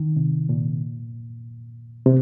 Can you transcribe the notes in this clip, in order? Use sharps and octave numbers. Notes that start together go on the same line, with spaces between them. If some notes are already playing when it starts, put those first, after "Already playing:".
Already playing: D#3
C3
A#2
C3